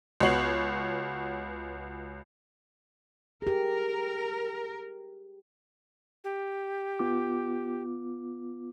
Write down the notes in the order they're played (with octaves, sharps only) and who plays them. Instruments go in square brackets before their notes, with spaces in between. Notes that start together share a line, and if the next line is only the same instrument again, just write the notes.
[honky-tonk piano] C#2 B3 F#4 C#5 C7 F#7
[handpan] G4 G#4 [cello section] A#4
[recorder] G4
[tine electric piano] B3 F4 D6